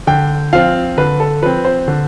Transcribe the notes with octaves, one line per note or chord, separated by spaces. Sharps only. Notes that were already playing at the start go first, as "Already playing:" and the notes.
D3 G5
F3 C4 F5
D3 B4
A4
F3 C4 B4
C5
D3